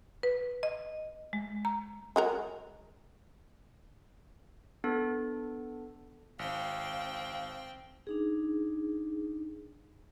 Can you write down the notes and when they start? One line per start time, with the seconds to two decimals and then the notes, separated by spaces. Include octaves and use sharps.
0.23 B4
0.63 D#5
1.33 G#3
1.65 A#5
2.16 G#3 F#4 A#4
4.84 B3 D4 A4
6.39 G#1 C4 F5 G5
8.07 D4 D#4 G#4